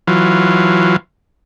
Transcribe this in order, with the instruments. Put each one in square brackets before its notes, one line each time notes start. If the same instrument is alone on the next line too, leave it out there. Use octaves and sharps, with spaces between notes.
[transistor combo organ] E3 F#3 F4